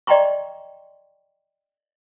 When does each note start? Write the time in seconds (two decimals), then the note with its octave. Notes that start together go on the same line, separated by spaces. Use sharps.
0.07 D5 D#5 G5 A#5 C6 C#6